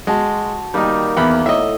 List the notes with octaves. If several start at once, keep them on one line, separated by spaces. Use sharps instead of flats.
G#3 F#4 A5 C6
D#3 G3 A#3 D#4
E2 B5
A2 D#5 E5